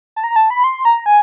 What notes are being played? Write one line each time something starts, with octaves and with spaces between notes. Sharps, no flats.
A5
A#5
A5
B5
C6
A#5
G#5